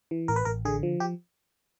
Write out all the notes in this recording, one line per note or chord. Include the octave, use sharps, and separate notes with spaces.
E3
A1 A#4
B4
A1 A#4
D3 G#4
F3
G4